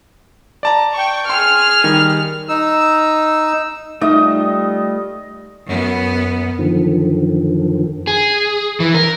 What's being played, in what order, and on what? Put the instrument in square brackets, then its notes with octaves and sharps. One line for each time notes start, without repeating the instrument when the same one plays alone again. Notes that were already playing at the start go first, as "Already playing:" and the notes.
[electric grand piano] D5 A5 A#5
[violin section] G5 C#6
[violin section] G#4 F6 [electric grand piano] C6
[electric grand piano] D#3 G3
[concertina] D#4 E6
[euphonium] G3 [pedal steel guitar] A3 F4 D#6 [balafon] D#4 E5 [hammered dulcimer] D#5
[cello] F#2 B3
[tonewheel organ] F#2 D3 D#3 F3
[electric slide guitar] G#4
E3
A#4